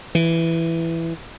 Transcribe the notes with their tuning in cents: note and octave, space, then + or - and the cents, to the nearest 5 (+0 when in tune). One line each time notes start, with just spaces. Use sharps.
E3 +5